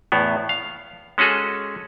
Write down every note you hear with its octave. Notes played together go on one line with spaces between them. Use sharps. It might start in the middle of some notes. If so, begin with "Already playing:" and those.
E2 A2 B3
F5
G#3 C#4 F#4 G#4 A4